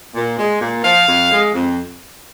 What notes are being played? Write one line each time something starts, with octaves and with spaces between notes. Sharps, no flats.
A#2
G#3
A#2
F3 F5
F2
G#3
F2